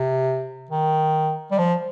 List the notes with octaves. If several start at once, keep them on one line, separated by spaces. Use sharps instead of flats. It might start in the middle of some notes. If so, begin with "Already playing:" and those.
Already playing: C3
D#3
G3
F3